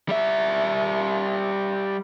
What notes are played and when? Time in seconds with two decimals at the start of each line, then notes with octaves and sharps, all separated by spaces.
0.09 G3 E5